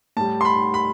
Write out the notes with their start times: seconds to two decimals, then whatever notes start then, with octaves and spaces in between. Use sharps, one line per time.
0.17 A2 A5
0.21 G3
0.41 C6
0.45 B5
0.74 B5